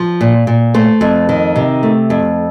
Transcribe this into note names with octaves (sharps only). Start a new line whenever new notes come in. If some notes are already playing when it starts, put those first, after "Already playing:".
Already playing: F3
A#2
A#2
A3 C5
F2
D#3
C3
A3
F2